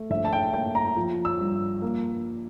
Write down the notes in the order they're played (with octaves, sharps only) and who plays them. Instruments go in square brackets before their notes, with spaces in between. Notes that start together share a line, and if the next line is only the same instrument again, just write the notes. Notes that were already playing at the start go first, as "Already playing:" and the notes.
Already playing: [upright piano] A3
A#1 E5
A5
G5
A#3 G5
A#5
F3
E6
G2
A#3